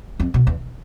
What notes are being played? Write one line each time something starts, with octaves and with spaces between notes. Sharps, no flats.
F2
B2
E2